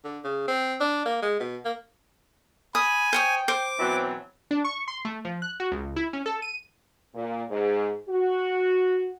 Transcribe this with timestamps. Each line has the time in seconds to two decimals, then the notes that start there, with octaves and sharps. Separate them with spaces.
0.04 D3
0.24 C#3
0.48 C4
0.81 D4
1.05 A#3
1.22 G#3
1.40 B2
1.65 A#3
2.75 G#5 B5 D#6
3.13 C5 C#5 G5 D#6
3.48 C5 D6
3.79 B2 E3 F#3 C4
4.51 D4
4.64 C#6
4.88 C6
5.05 A3
5.25 F3
5.42 F#6
5.60 F#4
5.72 C#2
5.96 E4
6.13 C#4
6.26 A4
6.42 D#7
7.13 A#2
7.49 G#2
8.08 F#4